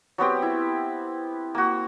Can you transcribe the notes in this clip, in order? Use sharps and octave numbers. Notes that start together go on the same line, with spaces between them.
F#3 B3 C4 G4
E4
A#3 F#4